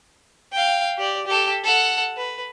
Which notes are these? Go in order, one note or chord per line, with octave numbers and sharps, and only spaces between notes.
F5 G5
G4 D5
G4 A4
A4 F#5
B4